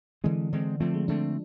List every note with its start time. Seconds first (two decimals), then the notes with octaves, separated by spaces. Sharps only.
0.24 D3 E3 G#3 C4
0.52 D3 G#3 C4
0.80 D3 F3 A3 C4
0.94 G#3
1.08 D3 A3 C4 D4